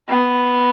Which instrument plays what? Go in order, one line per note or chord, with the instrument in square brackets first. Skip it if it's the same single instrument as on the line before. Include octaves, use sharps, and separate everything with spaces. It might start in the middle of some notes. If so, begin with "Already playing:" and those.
[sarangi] B3